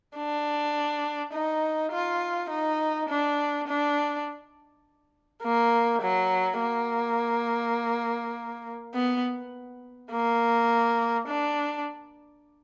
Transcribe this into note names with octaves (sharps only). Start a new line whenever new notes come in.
D4
D#4
F4
D#4
D4
D4
A#3
F#3
A#3
B3
A#3
D4